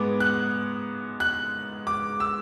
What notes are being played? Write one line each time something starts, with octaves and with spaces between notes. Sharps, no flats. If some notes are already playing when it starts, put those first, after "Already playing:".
Already playing: G#2 G#3 B3 D6
F#6
F#6
D6
E6